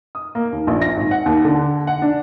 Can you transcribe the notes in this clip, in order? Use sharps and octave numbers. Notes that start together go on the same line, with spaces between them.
D#6
A#3
D#2
A#1
A#6
G#1
F#5
D#2
D3
F#5
D4